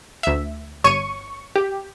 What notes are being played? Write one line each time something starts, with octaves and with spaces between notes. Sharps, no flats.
D2 E5
G1 C#5 C#6 D#7
G4